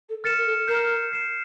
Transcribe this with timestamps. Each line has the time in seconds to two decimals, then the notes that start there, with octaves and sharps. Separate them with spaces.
0.09 A4
0.23 A#4 F6 A6 C#7 E7
0.37 A#4
0.45 A4
0.67 A#4 G6 C7 E7
1.12 G6 C7 E7